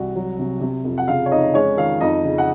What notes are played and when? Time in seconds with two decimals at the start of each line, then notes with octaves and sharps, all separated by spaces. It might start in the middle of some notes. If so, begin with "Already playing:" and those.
Already playing: C2 F#4 F#5
0.15 F#3
0.39 C3
0.61 C3
0.84 F2
0.98 F#5
1.08 C#3 F4 F5
1.26 C#5
1.31 F2 D#4 D#5
1.54 G#3 C#4 C#5
1.77 D#3 F4 F5
2.00 F2 D#4 D#5
2.24 C#3
2.38 F#5